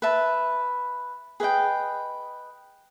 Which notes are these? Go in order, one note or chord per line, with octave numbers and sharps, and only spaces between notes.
B4 E5 A5
G#4 B4 D#5 G5